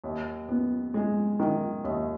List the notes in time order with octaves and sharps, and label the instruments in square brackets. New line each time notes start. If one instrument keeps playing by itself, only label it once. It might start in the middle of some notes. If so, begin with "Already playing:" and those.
[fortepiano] D#2
B3
G#3
D#3
D#2